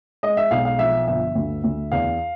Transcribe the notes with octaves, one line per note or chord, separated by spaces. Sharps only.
G#3 D#5
E5
B1 F5
F5
F3 E5
G1 E5
D2
D2
E2 F5